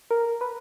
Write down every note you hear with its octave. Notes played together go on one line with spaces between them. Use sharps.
A#4
B4